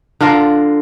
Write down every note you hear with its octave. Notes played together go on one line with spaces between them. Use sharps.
D3 D4 F4 A#4